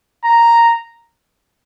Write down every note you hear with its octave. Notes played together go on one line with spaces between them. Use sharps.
A#5